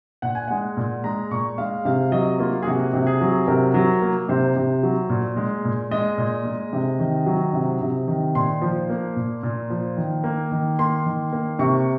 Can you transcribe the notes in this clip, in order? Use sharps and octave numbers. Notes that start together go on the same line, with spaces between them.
A#2 F#5
G#5
G#3 F#5
A#2
G#3 A#5
A#2 C#6
G#3 F5
C3 F5
F#3 D#5
A#3 F4
G#4
C3 F#4
C3
G#4
F#3
C3 A#4
F#3
A#3
C3 C5
C3
F#3
A#2
G#3
A#2
G#3 D#5
A#2
G#3
C3
D#3
F#3
C3
C3
D#3
A#2 C6
F3
A#3
A#2
A#2
F3
D#3
A#3
D#3
A#3 C6
D#3
A#3
C3 C#6